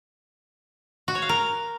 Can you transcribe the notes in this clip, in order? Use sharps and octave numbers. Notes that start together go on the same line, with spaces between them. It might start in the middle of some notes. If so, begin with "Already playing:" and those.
F#4
C#5
F5
A#4